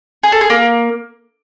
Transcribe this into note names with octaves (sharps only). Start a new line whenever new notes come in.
G#4
A4
G#4
A#3